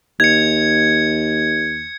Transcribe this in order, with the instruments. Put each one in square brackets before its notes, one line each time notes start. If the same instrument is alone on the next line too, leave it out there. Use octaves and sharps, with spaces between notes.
[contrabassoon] D#2 [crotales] G#6 C#7